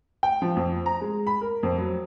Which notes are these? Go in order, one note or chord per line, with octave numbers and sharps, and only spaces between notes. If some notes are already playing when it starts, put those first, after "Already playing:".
G5
F3
F2
A#5
G#3
B5
A#4
F2
F#3